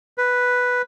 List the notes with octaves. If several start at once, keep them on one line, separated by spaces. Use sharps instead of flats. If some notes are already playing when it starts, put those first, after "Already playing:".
B4